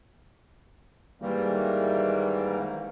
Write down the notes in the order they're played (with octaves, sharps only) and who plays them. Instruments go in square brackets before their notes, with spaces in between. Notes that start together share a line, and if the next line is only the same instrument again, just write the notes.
[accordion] G#2 D#3 E3 G3 A#3